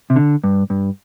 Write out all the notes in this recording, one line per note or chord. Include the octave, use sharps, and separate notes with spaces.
C3
D3
G2
G2